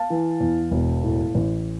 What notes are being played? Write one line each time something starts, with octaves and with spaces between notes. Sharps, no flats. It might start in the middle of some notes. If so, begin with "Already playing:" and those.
Already playing: F5 A5
E3
E2
E1
A2
A1